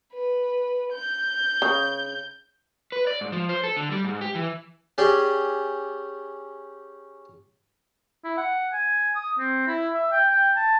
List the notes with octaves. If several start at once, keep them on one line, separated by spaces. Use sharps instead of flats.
B4
G6
C#3
B4
D5
G#2
F3
C5
A4
D3
G3
G#2
G4
E3
C#4 G4 G#4 D5 G5
E4
F#5
G#5
D#6
C4
E4
E5
G5
G5
A5